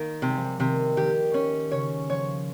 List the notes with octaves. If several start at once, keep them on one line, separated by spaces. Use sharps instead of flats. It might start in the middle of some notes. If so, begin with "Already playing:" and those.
Already playing: D#3 A#3
C3 G#3
G3
F3
G3
C3 D#3
D#3 G4
C#4
C#3 C#5
F3 C#5